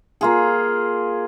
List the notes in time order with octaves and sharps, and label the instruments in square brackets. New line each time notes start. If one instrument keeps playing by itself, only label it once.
[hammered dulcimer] A#3 F4 G#4